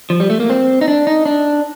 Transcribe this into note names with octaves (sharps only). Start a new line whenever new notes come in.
F3
G3
A3
A#3
C4
D#4
D4
D#4
D4